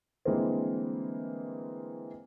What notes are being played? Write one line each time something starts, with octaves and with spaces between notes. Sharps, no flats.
D3 E3 G3 G#3 A#3 C4